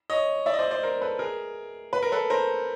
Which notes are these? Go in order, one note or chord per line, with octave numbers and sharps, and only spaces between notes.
C#5 D#5
D5 E5
D#5
C5 D5
C5 D5
A#4 C5
A4 B4
G#4 A#4
B4
A#4
A4 B4
A#4 C5